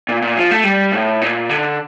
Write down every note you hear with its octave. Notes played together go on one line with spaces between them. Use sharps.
A#2
A#2
F3
A3
G3
A2
A#2
D3